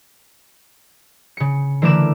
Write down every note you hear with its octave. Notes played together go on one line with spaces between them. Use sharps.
C#3 C#7
D3 E3 A3 A#4 D6 E7